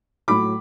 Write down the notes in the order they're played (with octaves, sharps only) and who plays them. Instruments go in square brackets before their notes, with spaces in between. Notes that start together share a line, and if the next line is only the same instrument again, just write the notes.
[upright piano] A2 F#3 B5 D6